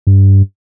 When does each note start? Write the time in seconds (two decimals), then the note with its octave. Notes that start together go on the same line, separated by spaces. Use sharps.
0.07 G2